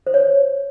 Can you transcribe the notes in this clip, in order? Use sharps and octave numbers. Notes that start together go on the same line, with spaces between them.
C5
C#5